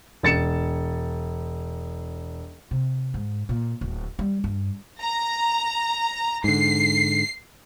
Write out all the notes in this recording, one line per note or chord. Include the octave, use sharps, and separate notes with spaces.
E1 A6 C#7 E7
C3
G#2
A#2
D1
G3
G2
A#5
G#2 D3 C7